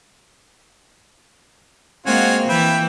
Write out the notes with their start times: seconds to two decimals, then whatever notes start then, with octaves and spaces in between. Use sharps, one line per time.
2.06 G#3 A#3 C4 F4 F#4 F#5 G#5
2.49 E3 B4 E5 G5